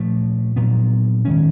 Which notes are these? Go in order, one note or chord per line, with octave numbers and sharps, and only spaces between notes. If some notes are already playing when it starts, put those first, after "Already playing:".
Already playing: A#2 F3 A3
A#2 F#3 B3
D#3 G#3 C#4